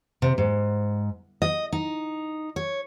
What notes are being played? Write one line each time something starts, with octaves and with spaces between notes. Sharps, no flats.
C3
G#2
D#5
D#4
C#5